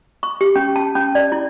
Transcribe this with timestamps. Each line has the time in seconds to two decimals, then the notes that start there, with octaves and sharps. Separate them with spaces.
0.23 C#6
0.41 G4
0.56 C#4
0.76 A5
0.95 C#4
1.15 D5
1.32 E4